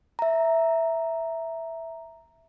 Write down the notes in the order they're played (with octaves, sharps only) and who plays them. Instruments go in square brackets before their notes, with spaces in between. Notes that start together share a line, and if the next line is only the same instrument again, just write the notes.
[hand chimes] E5 A#5